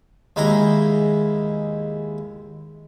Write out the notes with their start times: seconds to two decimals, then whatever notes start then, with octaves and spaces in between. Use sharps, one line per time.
0.36 D#2 G#3 E4 A#5